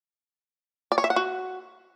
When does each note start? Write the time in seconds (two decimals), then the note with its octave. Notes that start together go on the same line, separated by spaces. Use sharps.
0.92 D5
0.98 C#5
1.04 E5
1.10 F#5
1.16 F#4